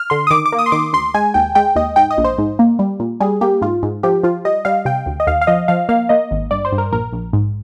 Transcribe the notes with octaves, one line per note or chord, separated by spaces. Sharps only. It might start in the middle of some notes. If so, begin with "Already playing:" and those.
Already playing: F6
D3 C6
D#6
D#3 D6
D6
A#3
D#6
C6
D#3 D6
D2 C6
G#3 G#5
D#2 G5
G#3 G5
D#2 D#5
G#2 G5
D#5
A#1
C5
G#2
A#3
G3
A#2
G3 G#4
A#3 G4
G#2 F4
G#2
F3 G4
F3 F4
G3 D#5
G3 F5
C3 G5
D2
D#5
D#2 F5
F5
F3 D#5
F3 F5
A#3 F5
A#3 D#5
G#1
G2 D5
C5
G2
A#4
A#1 A#4
A#1
G#2